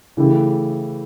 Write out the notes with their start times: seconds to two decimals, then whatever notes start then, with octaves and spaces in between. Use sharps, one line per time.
0.17 C#3 E3 A3 E4 G4